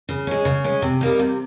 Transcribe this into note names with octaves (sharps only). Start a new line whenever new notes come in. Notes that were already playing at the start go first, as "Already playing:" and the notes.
C#3
G#3 C#4
C#3
G#3 C#4
C3
G3 A#3 D#4
C3